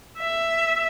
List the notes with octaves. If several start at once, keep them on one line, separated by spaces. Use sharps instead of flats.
E5